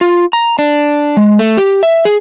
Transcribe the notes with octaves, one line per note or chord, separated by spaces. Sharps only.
F4
A#5
D4
G#3
A3
G4
E5
G#4